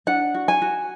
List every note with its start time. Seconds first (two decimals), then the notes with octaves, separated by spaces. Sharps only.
0.07 D4 F#5
0.34 F#4
0.48 G#5
0.62 F#4